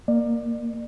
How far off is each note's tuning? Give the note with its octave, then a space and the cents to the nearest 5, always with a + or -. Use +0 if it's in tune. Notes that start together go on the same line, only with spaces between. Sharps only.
A#3 +0 D5 +30